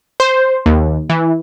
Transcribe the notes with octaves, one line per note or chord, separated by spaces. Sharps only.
C5
D#2
E3